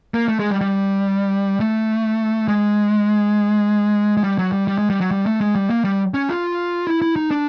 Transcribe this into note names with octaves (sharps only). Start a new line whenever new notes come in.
A#3
A3
G#3
G3
G3
A3
G#3
G#3
G3
F#3
G3
G3
G#3
G3
F#3
G3
A3
G#3
G3
A#3
G3
C#4
F4
E4
E4
D#4
D4